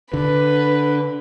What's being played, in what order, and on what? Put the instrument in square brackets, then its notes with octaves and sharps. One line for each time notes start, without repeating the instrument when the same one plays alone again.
[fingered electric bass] D3 [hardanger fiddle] B4